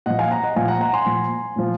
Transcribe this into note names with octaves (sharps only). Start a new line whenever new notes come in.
A#2 F3 D#5 F#5
F5 G#5
F#5 A#5
D#5 F#5
A#2 F3 F5 G#5
F#5 A#5
F#5 A#5
G#5 C6
A#2 F3
A#2 F3